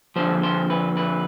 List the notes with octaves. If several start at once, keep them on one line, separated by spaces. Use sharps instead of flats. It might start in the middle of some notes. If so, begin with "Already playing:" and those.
F2 D3 F3 C5
C5
B4
B4